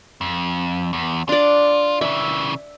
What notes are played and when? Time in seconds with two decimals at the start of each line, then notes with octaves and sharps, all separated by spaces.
0.21 F2
0.93 E2
1.29 D4 F4 D5
2.01 C#3 E3 E5